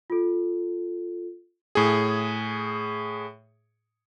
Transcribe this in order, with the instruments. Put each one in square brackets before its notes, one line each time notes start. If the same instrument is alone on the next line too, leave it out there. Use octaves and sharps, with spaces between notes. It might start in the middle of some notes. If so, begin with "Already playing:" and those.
[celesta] F4 A4
[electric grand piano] A2 G#4